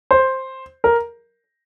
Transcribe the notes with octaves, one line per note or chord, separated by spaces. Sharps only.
C5
A#4